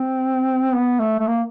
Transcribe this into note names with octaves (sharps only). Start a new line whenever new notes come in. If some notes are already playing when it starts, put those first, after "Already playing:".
Already playing: C4
B3
A3
A3
A#3